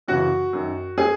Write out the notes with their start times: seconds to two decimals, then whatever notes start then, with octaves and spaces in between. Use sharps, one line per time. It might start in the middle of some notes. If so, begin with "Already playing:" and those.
0.08 F#2 C#3 E3 F#4
0.53 F#2 D#3
0.98 G#4